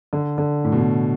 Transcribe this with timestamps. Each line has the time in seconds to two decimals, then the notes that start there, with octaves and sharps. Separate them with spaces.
0.13 D3
0.38 D3
0.64 A2
0.72 B2
0.81 A2